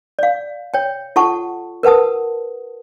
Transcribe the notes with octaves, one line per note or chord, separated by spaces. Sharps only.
D5 F5
C#5 G5
F4 A4 F#5 A5 C#6
A#4 B4 F#5 A5 D#6